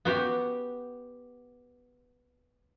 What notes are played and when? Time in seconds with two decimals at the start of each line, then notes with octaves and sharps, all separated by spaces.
0.05 B3 F#4 G4